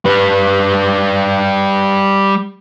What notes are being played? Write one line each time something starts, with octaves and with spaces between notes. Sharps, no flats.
G3 B4